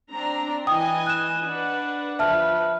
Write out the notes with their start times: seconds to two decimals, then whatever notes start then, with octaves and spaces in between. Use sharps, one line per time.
0.11 C4 D4 A#5
0.67 E3 D#5 G5 G#5 D#6
1.06 F#6 E7
1.42 D4 B4 F#5
2.19 F3 B4 E5 A5 F6